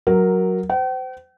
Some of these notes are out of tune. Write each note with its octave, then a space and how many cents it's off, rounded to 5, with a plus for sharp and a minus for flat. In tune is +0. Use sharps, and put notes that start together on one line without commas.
F#3 +0 A#4 +0
C5 -30 G5 -45